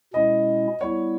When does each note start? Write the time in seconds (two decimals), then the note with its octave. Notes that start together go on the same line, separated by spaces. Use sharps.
0.13 B2 G#3 C#4 E4 D#5
0.81 G3 B3 E4 C#5